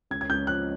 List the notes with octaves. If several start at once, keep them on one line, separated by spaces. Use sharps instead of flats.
C#2 G#6
G#6
C#2 G6
F3 F#6